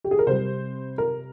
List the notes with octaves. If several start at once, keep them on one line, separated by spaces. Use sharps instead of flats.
G4
G#4
A#4
C3 G3 C5
A#4